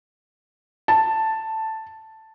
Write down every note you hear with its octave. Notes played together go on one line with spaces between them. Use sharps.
A5